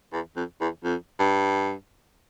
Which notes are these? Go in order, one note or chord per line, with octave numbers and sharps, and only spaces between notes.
E2
F2
E2
F2
G2